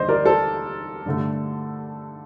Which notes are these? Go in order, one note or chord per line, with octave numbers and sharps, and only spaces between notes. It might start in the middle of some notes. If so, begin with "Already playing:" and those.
Already playing: D#2 D3 G3 C5 D#5
A#4 D5
A4 C5
G2 D3 A3